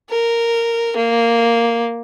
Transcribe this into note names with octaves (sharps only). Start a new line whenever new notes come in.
A#4
A#3